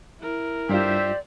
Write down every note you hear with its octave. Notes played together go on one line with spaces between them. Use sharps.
E4 A#4
G2 F4 G4 C5 D5 E5